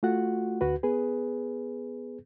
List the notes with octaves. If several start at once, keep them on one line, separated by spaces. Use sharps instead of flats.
A3 F4 F#4 F#5
D2 F#4 B4
B3 G#4 B4